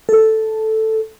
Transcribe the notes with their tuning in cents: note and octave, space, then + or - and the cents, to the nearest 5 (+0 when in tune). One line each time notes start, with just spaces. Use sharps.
A4 +0